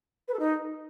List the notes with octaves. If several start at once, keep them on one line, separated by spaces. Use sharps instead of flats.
B4
A4
D#4